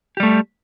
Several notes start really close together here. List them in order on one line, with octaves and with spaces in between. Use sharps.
G4 G3 A3